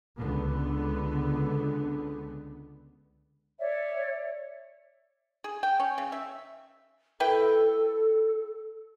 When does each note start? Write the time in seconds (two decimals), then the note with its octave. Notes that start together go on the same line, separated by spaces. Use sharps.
0.18 C#2 D3 B3
3.59 C#5 D5 E5
5.44 G#4
5.63 G5
5.80 C#4
5.98 C#3
6.12 E5
7.20 E4 A4 B4 G5